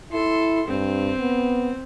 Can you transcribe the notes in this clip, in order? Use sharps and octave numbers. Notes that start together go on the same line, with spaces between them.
E4 A4 C6
G2 C4
B3